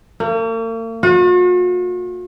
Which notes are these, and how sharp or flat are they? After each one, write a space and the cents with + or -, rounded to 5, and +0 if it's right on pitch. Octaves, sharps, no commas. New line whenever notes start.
A#3 -45
F#4 -45